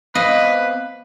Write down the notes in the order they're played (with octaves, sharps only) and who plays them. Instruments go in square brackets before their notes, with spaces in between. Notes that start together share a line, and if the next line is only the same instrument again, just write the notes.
[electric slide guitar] B3 C4 F5 [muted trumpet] B4 [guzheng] D#5